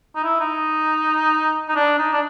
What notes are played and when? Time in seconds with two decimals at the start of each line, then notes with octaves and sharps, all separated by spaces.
0.16 D#4
0.24 E4
0.40 D#4
1.69 D#4
1.76 D4
1.98 D#4
2.13 D4